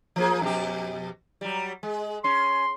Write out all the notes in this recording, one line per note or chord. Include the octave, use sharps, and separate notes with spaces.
F3 A#3 G#4
F2 B2 G4
F#3 G3
G#3
C#4 C6